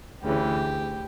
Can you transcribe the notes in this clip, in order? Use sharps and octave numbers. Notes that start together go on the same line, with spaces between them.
D2 C#3 E3 G4